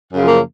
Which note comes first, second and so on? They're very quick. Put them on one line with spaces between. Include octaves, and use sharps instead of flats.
F#2 C#3 F3 A#3